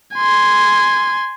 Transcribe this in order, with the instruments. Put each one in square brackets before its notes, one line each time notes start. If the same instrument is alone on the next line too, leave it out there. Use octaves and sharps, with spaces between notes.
[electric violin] G#5 C6